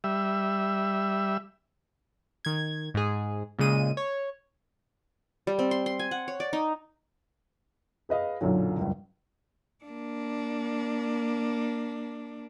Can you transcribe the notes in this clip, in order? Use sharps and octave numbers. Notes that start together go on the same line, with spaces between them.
G3 E5
D#3 G#6
G#2 G#4
A#2 C#3 G#3 D#7
C#5
G3
C4
C6
C6
G#5
F#5
C#5
D5
D#4
G#4 B4 D#5 F5
B1 F#2 A#2 D3 F#3
F#1 C#2 G2
A#3 D4